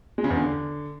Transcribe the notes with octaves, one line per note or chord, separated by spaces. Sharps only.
G#3
C#3
E2
D3